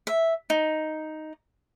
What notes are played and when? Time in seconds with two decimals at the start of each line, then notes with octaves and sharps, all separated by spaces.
0.07 E5
0.50 D#4